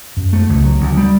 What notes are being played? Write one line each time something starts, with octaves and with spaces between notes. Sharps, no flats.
F#2
A3
C#2
F#3
D2
G3